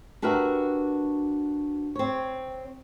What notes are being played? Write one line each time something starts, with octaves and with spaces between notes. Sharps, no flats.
D4 F#4 G4 A#4 B4 E5
C4 C#5